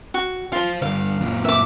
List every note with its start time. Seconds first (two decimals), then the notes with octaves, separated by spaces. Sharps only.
0.14 F#4
0.52 F4 C5 F5
0.82 D3 G3 F5
1.21 F#2 A#2
1.45 E5 D6